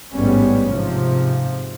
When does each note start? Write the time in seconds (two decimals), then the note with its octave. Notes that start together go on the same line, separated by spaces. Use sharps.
0.13 A1 G#2 G3 B3 C#4
0.72 G#2 C3 F3